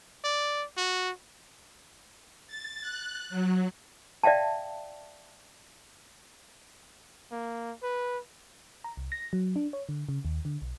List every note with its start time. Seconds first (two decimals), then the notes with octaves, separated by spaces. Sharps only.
0.24 D5
0.77 F#4
2.47 A6
2.81 F#6
3.30 F#3
4.23 D5 E5 F5 G5 A5
7.31 A#3
7.83 B4
8.84 A#5
8.97 C2
9.12 A#6
9.33 F#3
9.56 D4
9.73 C#5
9.89 D3
10.09 C#3
10.25 D#2
10.45 D3
10.62 B1